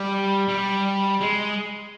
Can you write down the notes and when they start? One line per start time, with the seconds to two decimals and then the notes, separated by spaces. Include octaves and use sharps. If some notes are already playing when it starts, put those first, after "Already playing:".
Already playing: G3
0.49 G3
1.21 G#3